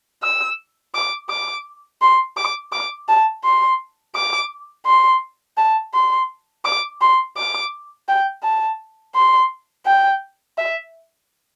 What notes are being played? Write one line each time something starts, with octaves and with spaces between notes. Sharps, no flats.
E6
D6
D6
C6
D6
D6
A5
C6
D6
C6
A5
C6
D6
C6
D6
G5
A5
C6
G5
E5